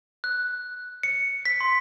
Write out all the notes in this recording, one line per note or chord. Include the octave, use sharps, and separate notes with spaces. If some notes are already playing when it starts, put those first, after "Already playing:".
F#6
C#7
B6
C6